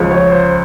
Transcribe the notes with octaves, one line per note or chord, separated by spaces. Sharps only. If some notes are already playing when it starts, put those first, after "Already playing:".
Already playing: C#2 C#3 F3
C#5
C5